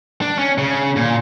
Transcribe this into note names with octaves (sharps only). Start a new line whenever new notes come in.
D4
C#4
C#3
A#2